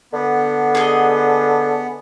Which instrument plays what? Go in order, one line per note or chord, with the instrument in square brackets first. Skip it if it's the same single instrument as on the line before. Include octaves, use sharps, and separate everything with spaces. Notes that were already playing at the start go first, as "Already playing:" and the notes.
[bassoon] D3 [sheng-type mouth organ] B3
[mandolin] G#4 D#5